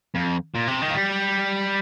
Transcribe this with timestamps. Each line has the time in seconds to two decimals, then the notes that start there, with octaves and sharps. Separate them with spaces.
0.15 F2
0.55 A#2
0.68 C3
0.82 D#3
0.91 A#3
0.95 G3